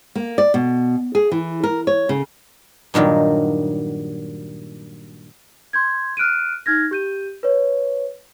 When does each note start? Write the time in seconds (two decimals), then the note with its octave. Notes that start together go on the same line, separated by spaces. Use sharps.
0.15 A#3
0.38 D5
0.54 B2
1.15 G#4
1.32 E3
1.64 A#4
1.87 C#5
2.09 C#3
2.94 G2 A#2 D#3 F#3
5.73 C6 G6 G#6
6.17 F6 F#6 D7 D#7
6.66 D#4 F6 G#6 A#6
6.91 G4 G6 D#7
7.43 B4 C#5